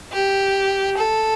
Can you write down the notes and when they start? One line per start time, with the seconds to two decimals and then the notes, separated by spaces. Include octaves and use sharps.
0.12 G4
0.97 A4